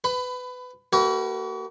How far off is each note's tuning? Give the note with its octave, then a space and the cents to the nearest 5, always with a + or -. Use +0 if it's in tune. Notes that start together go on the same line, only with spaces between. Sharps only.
B4 +20 B5 +30
A#3 -40 F#4 +45 B4 +0